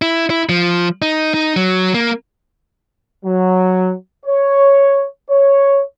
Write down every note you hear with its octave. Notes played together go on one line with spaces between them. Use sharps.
E4
E4
F3
D#4
D#4
F#3
A#3
F#3
C#5
C#5